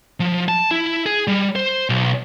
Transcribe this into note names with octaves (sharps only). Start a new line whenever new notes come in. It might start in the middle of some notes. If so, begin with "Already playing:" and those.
F3
A5
E4
G#4
G3
C5
B1